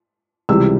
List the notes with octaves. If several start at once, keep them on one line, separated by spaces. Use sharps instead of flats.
C#2 C3 E3 G3 E6